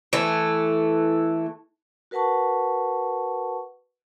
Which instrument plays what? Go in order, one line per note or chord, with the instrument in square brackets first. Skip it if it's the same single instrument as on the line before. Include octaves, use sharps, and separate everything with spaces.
[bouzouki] E3 A3
[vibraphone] F#4 A#4 B4 F#5 A5 C#6